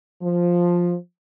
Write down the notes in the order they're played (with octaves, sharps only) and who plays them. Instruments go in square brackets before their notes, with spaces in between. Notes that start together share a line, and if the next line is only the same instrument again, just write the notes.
[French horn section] F3